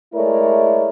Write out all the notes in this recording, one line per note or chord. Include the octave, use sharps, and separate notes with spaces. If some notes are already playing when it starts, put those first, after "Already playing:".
G#3 A3 E4 A#4 C#5 D5